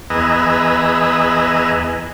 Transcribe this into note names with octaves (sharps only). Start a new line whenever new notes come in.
E2 G#4 B4 D#5 A#5 E6